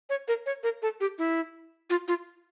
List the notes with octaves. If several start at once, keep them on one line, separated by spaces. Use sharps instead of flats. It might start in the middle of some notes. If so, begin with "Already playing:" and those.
C#5
A#4
C#5
A#4
A4
G4
E4
F4
F4